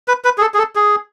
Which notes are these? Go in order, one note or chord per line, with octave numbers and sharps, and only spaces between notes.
B4
B4
G#4
A4
G#4
A4
G#4